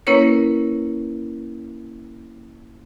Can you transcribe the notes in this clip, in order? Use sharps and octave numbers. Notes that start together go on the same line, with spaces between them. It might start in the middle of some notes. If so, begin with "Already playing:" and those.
A#3 C#4 E4 A#4 B4 C#5